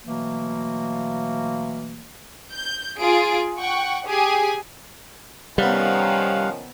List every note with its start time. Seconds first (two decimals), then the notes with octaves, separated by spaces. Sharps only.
0.05 B2 E3 F#3 A3 A#3
2.53 G6
2.98 F4 G#4 D7
3.57 F#5 G5 C#6
4.05 G4 G#4 G#5
5.58 C3 D#3 F3 G3 B3 C#4 F5 F#5